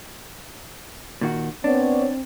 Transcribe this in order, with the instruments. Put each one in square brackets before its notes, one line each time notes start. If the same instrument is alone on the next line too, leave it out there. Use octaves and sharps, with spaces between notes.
[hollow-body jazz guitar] A#2 D#3 F#4
[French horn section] B3 C#5 D5 [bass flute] C4 [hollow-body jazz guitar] D4